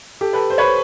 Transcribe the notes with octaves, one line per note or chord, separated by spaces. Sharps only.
G4 A4
A4 B4
C5
B4 C#5